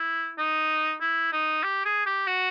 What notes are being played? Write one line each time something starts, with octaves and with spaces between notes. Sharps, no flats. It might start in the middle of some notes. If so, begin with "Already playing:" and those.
Already playing: E4
D#4
E4
D#4
G4
G#4
G4
F#4